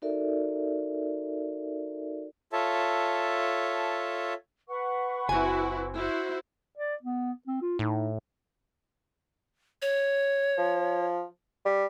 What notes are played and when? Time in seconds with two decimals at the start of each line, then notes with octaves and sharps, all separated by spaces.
0.02 D#4 F#4 A4 A#4 D5 E5
2.53 F4 A4 C#5 E5 A5
4.68 B4 F#5 C#6
5.29 F#1 C4 E4 F#4 G#5
5.97 E4 F#4 C5
6.77 D5
7.02 B3
7.47 C4
7.62 F4
7.79 A2 D#4
9.82 C#5
10.57 F3
11.65 G3